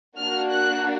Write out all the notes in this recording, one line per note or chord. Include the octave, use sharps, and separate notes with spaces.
A#3 D4 F#4 F6
F#6